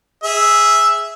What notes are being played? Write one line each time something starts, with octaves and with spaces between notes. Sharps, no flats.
G#4 E5